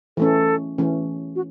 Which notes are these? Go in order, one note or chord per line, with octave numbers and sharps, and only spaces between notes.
E3 A3 C#4 A4
E3 A3 C#4
F#4